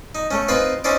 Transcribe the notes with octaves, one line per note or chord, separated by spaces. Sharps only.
D#4
A3 C#4
C4 D#4 F4 B4 B5 C6
C#4 D#4 E4 C5 D5